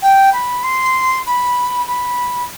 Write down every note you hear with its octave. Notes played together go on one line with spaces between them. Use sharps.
G5
B5
C6
B5
B5